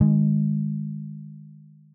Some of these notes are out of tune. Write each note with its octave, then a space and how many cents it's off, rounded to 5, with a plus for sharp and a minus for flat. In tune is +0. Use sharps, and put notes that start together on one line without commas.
D#3 -30 G#3 -15